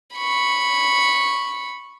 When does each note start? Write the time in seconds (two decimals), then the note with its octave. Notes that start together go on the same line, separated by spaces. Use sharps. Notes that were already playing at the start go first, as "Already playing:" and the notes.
0.15 B5 C#6